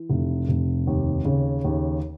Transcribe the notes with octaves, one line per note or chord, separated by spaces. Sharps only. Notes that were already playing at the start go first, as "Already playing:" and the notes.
Already playing: E3
F1
F1
D#2
C#3
D#2